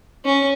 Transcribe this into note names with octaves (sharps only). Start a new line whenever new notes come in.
C#4